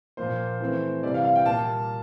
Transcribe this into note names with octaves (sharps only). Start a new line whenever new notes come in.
A#2 F3 A#3 C5
E3 A3 C4
C3 E3 G3 D5
F5
F5
G5
A#2 G3 A#3 A5